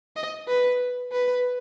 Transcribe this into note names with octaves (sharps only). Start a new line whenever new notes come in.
D#5
B4
B4